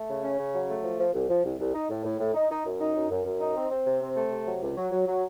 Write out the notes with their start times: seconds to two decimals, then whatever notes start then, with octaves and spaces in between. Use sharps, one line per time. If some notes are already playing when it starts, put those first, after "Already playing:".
Already playing: A3
0.08 C#3
0.23 C#4
0.38 C#3
0.53 F#3
0.69 A3
0.83 F3
0.99 F3
1.14 C2
1.28 F3
1.44 C2
1.59 C2
1.74 D#4
1.90 A2
2.04 A2
2.19 A2
2.34 D#4
2.50 D#4
2.65 F#2
2.80 D#4
2.95 F#2
3.11 F#2
3.26 F#2
3.40 D#4
3.56 C4
3.71 C4
3.86 C3
4.01 C4
4.16 A3
4.31 C3
4.46 F#3
4.61 C#2
4.76 F#3
4.92 F#3
5.07 F#3